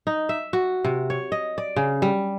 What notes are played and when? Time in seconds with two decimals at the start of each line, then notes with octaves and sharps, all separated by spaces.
0.07 D#4
0.29 E5
0.53 F#4
0.84 C3
1.10 C#5
1.32 D#5
1.58 D5
1.76 C#3
2.02 G3